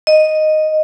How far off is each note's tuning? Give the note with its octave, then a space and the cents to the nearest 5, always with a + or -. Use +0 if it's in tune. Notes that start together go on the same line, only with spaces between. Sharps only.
D#5 -5